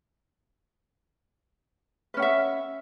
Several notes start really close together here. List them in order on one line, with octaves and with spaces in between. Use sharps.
B4 C#4 F#5 E5